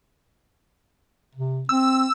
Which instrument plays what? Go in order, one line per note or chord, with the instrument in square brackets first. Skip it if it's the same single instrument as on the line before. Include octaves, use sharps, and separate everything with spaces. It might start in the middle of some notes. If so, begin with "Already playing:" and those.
[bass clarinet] C3
[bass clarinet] C4 [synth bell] E6